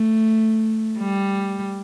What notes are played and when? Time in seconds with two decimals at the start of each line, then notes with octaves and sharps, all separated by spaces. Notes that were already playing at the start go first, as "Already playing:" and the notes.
Already playing: A3
0.99 G3